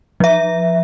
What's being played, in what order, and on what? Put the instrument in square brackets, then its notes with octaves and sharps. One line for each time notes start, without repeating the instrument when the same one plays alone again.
[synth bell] F3 E5